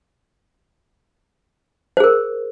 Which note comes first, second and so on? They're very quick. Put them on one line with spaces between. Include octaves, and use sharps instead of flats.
C5 G#4 A#4